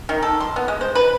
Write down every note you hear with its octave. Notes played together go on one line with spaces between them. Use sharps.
D#3
A4
C6
B3
G#3
C5
B4